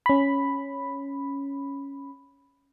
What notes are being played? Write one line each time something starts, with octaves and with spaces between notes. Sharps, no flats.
C#4 B5